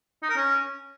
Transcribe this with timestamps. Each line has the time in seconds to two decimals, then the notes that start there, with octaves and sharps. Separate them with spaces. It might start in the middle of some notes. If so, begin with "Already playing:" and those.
0.22 D#4
0.30 A#4
0.37 C#4